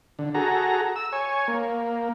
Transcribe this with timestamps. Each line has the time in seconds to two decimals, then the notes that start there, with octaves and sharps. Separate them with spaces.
0.19 D3
0.34 F#4 G#4 A4 A#5
0.96 E6
1.12 C#5 G#5
1.48 A#3